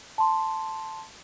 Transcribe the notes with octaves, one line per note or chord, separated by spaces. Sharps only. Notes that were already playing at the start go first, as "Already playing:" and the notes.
A5 C6